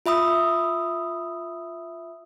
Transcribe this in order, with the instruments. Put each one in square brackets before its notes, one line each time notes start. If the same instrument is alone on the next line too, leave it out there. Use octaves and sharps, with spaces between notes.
[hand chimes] F4 E5 B5 D#6 E6